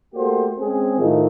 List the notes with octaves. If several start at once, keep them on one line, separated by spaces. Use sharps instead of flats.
A3 A#3 F#4 G4 C5
G#3 C4 C#4 G#4
A2 D#3 F3 A3 D#4